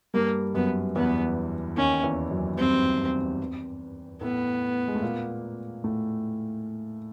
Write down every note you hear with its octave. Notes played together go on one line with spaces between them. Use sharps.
G2 G3 A#3
F#2 F#3 B3
E2 E3 B3
D#2 D#3 C#4
E2 E3
F#2 F#3
G2 G3 C4
A2 A3 B3
G#3
A3
A#2 A#3
A2 A3